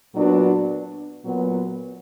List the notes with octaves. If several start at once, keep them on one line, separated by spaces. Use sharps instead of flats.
A#2 F#3 B3 D4 F#4
A#2 F#3 B3